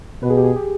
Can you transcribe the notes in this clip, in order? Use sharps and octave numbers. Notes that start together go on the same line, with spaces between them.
B2 B4
G#4
G4
G#4
G4